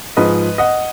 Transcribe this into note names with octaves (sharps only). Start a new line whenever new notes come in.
G#2 F3 G#3 B4 D#5
D#5 F#5